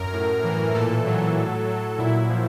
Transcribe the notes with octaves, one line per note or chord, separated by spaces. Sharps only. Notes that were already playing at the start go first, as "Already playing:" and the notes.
Already playing: F#2 A#4
A2
E3
A#2 A4
F#3
A2
F#3
A#2 E4
F3